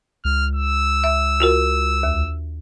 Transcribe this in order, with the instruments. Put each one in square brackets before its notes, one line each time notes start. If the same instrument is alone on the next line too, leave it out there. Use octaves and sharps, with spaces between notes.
[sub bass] C#2 [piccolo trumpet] F6
[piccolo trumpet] E6
[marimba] E5
F4 F#4 A#4
D#2